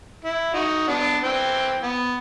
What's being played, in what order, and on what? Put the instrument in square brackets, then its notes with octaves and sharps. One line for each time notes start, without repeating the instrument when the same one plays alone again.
[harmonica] E4
D#4 F#4
B3 D4
E3 C4 G5
B3